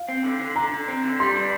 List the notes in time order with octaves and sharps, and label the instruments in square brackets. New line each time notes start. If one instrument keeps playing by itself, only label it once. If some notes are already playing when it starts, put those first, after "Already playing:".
Already playing: [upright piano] F5
[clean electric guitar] C4
D3
D3
[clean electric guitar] D3 [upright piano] A#5
[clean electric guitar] D3
C4
D3
[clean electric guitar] G3 [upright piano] C6
[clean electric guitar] D4